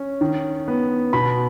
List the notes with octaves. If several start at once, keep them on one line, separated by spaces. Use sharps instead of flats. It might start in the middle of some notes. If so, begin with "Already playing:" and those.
Already playing: C#4
D#3
B3
B2 B5